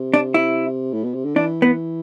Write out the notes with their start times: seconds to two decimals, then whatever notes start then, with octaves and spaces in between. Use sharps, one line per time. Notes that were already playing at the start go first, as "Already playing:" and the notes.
Already playing: C3
0.14 D4
0.34 E4
0.93 A2
1.04 B2
1.14 C3
1.24 D3
1.36 E3 D4
1.62 B3